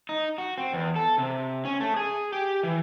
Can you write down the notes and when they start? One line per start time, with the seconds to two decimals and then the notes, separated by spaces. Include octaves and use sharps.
0.09 D#4
0.38 F#4
0.58 C4
0.73 E2
0.96 A4
1.18 C3
1.65 C#4
1.80 A3
1.96 G#4
2.33 G4
2.63 E3